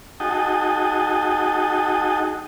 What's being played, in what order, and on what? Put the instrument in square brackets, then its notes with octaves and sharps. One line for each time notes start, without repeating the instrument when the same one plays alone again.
[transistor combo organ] D#4 F#4 G#4 G5 A5 D#6